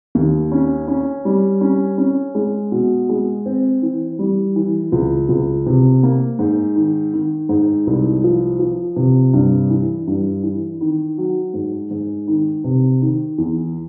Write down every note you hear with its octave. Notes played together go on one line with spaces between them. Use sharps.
D#2
C#4
C#4
G3
C#4
C#4
G#3
B2
G#3
C4
E3
G3
E3
C#2
C#2
C3
A#3
G#2
D#3
D#3
G#2
C2
F3
F3
C3
G2
E3
G2
E3
D#3
F#3
G#2
G#2
D#3
C3
D#3
E2